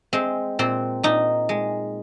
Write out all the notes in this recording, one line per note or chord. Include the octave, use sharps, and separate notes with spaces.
G#3 C4
A#2 C4
A#2 D#4
G#3